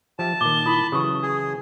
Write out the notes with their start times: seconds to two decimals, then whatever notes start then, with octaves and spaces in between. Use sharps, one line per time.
0.19 F3 G4 E5 A5
0.41 A#2 D#3 D6 G7
0.66 E4 F4 B5 D#6
0.92 C#3 E3 F#3 G4 C#6 D#6
1.23 G#4